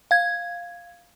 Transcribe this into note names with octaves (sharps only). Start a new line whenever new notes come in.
F5 G#6